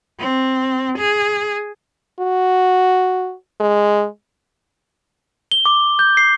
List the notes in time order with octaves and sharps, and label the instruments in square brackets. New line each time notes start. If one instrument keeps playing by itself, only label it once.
[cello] C4
G#4
[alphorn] F#4
G#3
[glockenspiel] G7
D6
G6
C7